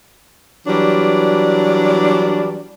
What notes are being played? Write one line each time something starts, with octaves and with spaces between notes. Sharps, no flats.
E3 F#3 G3 D4